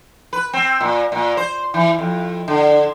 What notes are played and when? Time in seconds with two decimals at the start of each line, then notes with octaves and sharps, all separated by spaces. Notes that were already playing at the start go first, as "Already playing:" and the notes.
0.33 B4
0.53 C4
0.81 A#2
1.12 A#2
1.37 C5
1.74 E3
1.99 F2
2.48 D3